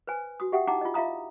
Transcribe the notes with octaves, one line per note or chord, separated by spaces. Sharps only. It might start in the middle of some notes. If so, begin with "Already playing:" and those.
B4 C5 G#5
F#4 D#6
G4 E5 F#5 G5 D#6
D#4 E4 F#5 G5 A#5 D6
F4 D#5
F4 E5 F5 A#5 D#6